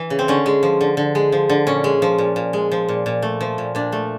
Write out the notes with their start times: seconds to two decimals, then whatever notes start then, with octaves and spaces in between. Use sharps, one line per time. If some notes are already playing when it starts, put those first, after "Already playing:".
Already playing: E3
0.10 C#3
0.19 C4
0.28 D3 C#4
0.46 G#3
0.63 F3
0.81 D3
0.97 D3
1.15 G#3
1.32 F3
1.50 D3
1.67 A#2 C#4
1.84 G#3
2.02 F3
2.18 A#2
2.36 A#2
2.53 G#3
2.72 F3
2.89 A#2
3.06 A#2
3.22 A3
3.41 F3
3.58 A#2
3.75 A#2 D4
3.92 A3